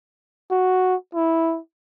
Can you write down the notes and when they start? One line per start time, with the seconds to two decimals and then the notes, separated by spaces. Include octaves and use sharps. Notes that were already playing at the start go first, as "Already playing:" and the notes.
0.51 F#4
1.15 E4